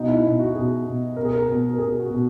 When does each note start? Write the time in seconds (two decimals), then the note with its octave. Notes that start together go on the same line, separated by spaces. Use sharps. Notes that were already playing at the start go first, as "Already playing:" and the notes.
Already playing: B2 D#4
0.08 E4
0.23 B2 E4
0.39 F#4
0.55 B2 G#4
0.86 B2
1.16 B2 A#4
1.25 G#4
1.33 A#4
1.48 B2
1.74 A#4
1.79 B2 G#4
1.99 F#4
2.10 B2